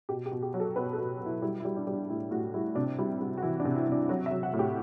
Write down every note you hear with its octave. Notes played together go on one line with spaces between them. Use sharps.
B2 G4
G4
B2
G4
F#3
A4
B2 B4
A4
B2
B2
E4
G3 E4
E4
G3
D4
G3
D4
A2 E4
A2 F#4
G3 E4
C3 D4
G3 E4
G3 F#4
F#4
E3 E4
D4
C3
E4
C3
D4
F#3 F#4
E5
F#3
F#5
A2
G4